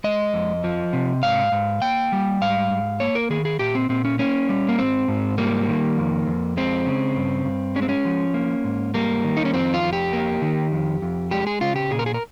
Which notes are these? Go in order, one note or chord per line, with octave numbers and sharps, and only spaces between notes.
G#3 D#5
F2
F3
C3
G#2 F5
G#2
A#3 G5
G3
G#2 F5
G#2
A#3 C#5
A#4
D#3 G#4
G#4
A#2 G4
C4
A#2 C4
C#4
A#3 C#4
G3
A#3
G#2 C4
G#2
G3 A#3
D#3
F2
F2
G#3 C4
C#3
G2
G2
G#3 C#4
C4
C#4
F3
A#3
G#2
G3 A#3
D#3
D#4
C#4
F2 C4
F4
F2
G4
A#3
D#3
F2
F2
G#3 G4
G#4
C#3 F4
G4
A#2 G#4
A#4
G#4
A#4